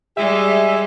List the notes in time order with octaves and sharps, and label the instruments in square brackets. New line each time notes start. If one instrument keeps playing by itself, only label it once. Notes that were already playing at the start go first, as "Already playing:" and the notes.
[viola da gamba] G3 G#3 [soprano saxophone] G#4 [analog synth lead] E5